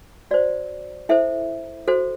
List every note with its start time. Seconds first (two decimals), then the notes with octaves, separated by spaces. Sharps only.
0.31 F#4 C5 D5
1.09 E4 A4 C5 E5
1.88 F#4 A4 C5